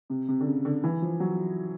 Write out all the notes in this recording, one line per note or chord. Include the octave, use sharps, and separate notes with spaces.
C3
C3
D3
C#3
D3
E3
F3
F#3